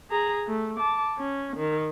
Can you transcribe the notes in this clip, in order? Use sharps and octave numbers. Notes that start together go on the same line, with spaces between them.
G#4 A#5
A3
A5 D6
C#4
D#3